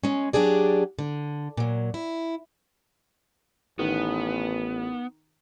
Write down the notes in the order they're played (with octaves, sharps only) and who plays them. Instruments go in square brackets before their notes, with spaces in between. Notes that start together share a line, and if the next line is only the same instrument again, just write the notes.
[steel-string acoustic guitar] G#3 C#4
F#3 D4 G4 G#4 D5
D3
A#2 F#3
E4
[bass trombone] A1 [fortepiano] D#3 [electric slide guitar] B3